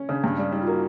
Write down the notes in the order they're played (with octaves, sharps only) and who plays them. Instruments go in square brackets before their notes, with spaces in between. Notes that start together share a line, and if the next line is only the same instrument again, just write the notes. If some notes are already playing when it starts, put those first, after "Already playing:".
Already playing: [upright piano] C#4
[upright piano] C#3 [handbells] D4
[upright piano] G2
G3
[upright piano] G3 [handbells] D#4
[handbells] F4
[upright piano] A#3 [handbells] F#4